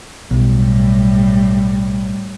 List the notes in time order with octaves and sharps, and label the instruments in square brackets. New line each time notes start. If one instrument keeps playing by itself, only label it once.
[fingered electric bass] B1 [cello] A2 G3